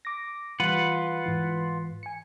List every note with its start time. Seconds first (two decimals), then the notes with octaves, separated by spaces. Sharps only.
0.05 D6 A#6
0.60 E3 G3 F4 B4 F#5 C#7
1.26 G#2 E3
2.03 G#5 C#7